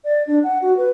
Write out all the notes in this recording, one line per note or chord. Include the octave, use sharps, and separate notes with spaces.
D5
D4
F#5
F#4
B4